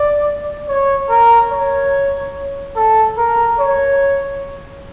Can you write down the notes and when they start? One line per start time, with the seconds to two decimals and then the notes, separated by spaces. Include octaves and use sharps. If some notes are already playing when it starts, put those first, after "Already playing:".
Already playing: D5
0.68 C#5
1.10 A#4
1.52 C#5
2.76 A4
3.17 A#4
3.59 C#5